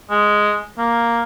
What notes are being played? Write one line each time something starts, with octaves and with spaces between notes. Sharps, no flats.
G#3
A#3